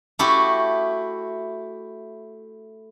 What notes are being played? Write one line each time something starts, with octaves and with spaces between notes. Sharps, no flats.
A3 E4 F#4 G4